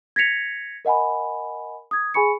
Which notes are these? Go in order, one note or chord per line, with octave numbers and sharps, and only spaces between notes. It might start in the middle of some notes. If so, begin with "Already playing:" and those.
G#6 A#6 B6 C#7 F7
A#4 D#5 F#5 G#5 B5
D#6 G#6
G#4 G#5 B5 C#6 C#7